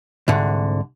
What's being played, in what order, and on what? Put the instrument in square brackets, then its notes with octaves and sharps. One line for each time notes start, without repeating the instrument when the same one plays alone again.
[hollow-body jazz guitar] C2 G#2 D3